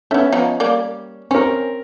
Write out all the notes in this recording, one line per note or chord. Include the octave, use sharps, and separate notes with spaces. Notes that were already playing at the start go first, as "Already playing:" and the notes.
A3 B3 C#4 E5
F3 B3 D#4
G3 A#3 D5
C4 C#4 A#4